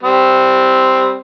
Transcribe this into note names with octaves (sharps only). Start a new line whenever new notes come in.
G3 C4